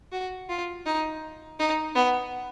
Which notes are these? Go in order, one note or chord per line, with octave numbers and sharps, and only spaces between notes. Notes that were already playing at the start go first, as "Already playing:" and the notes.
F#4
F4
D#4
D#4
B3